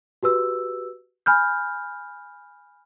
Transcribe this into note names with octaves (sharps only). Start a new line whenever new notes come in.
F#4 G4 B4 E6
G#5 B5 F6 G6